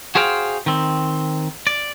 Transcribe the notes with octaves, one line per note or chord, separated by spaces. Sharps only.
F#4 G#4 C5 F5 G5
D#3 C4
D5